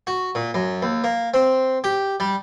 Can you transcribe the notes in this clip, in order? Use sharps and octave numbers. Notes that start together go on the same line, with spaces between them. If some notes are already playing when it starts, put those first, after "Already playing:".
F#4
A#2
F#2
D#2
A#3
C4
G4
G3